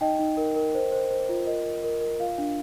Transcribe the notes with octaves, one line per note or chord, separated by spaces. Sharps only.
D#4 D#5 G5
D#4
A#4
A#4
C5
C5
C5
F4
A#4 D#5
A#4
A#4
A#4
F4 F5
D4